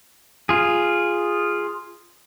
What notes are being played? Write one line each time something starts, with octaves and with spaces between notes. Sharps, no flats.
F4 G#4